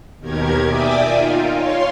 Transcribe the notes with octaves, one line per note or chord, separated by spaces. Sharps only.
D#2 B2 D#3 G4 A#4 G#6
D5 E5 G5 G#5 D6 D#6
D#4 F4
C#5 F5 C6